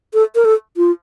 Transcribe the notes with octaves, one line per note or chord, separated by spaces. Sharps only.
A4
A#4
A4
F4